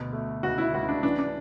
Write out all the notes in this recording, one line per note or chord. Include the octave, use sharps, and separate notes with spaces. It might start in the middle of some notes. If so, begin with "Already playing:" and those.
Already playing: D2 B2
A3
C#2 F#4
E4
C#2 F#4
D4
E3 D4
D4